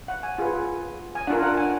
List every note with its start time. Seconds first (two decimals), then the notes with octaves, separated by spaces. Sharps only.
0.08 F#5
0.23 G#5
0.38 F4 G#4 B4
1.15 G#5
1.27 D4 F4 A#4 F#5
1.43 F#5
1.57 G#5